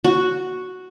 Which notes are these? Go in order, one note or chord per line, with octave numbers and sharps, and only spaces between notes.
F#4